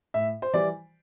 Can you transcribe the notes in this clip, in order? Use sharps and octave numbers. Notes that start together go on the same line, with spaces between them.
A2 E5
C5
E3 G3 D5